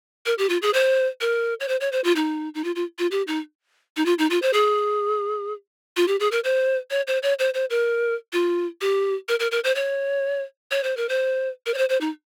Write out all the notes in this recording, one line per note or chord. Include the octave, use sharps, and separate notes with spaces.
A#4
G4
F4
G#4
C5
A#4
C#5
C5
C#5
C5
F4
D#4
D#4
F4
F4
F4
G4
D#4
D#4
F4
D#4
F4
C5
G#4
F4
G4
G#4
A#4
C5
C#5
C5
C#5
C5
C5
A#4
F4
G4
A#4
A#4
A#4
C5
C#5
C#5
C5
A#4
C5
A#4
C#5
C5
C5
D#4